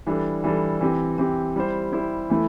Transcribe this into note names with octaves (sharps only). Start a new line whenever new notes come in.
E3 G3 D4 A4
E3 G3 D4 A4
E3 C4 G4
E3 C4 G4
G3 E4 G4 C5
G3 E4 G4 C5
E3 A3 E4